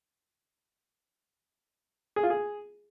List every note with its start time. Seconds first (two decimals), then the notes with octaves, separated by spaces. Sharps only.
2.16 G#4
2.23 F4
2.30 G#4